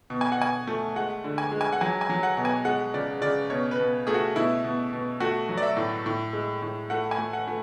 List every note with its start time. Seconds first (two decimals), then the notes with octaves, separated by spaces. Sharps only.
0.10 B2
0.21 G#5
0.32 F#5
0.38 B2 G#5
0.67 A3
0.96 G#3 F#5
1.24 D3
1.38 G#5
1.52 G#3
1.61 G#5
1.73 F#5
1.81 F#3 G#5
2.01 G#5
2.09 F#3
2.23 F#5
2.37 B2
2.45 G#5
2.65 G#3 F#5
2.94 C#3 D5
3.22 C#3 D5
3.50 B2 C#5
3.71 B4
3.79 B2
4.07 A3 G#4
4.14 F#4
4.36 B2 E4
4.64 B2
4.93 B2
5.20 A3 F#4
5.49 F#3
5.58 D5
5.62 E5
5.77 A2
6.06 A2
6.33 G#3
6.62 A2
6.90 A3 F#5
7.11 G#5
7.18 A3
7.33 F#5
7.47 A3